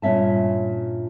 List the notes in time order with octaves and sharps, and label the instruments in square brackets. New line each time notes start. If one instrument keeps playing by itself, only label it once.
[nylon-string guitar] G2 A#2 C#4 E5 A5